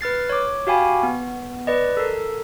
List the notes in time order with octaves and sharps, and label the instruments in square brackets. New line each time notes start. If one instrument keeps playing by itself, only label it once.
[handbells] B4 F6 A6 C7
C#5 D6
F#4 G4 F5 G5 G#5 B5
B3
B4 D5 D#5
A4 A#4